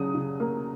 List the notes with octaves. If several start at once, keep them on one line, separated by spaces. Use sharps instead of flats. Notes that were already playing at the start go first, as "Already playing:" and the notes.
Already playing: C#3 F#3 D#6
C#3
A#3